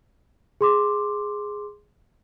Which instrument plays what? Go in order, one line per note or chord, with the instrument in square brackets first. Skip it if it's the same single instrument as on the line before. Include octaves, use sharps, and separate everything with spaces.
[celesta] G#4 C6 D6